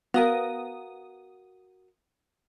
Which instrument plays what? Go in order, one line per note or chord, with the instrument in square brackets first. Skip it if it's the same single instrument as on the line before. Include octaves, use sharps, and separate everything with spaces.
[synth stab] B3 D#6 [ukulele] F#4 A#4 [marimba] F5